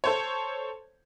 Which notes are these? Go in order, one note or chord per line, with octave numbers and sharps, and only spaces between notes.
A4 C5 C#5